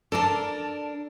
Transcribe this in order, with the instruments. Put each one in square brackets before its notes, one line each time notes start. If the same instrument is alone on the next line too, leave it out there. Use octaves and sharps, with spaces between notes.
[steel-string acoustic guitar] D4 A#4 [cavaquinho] A4 D5 A5